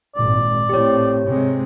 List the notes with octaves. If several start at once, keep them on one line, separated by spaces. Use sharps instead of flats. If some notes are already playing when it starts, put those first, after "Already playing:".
G#1 A#2 D5
A2 C4 G4 C#5
G#2 C3 G#3